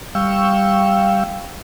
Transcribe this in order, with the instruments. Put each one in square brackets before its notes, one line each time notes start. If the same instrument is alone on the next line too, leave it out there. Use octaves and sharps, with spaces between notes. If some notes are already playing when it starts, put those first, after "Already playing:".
[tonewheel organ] G3 F5 G5 C#6 E6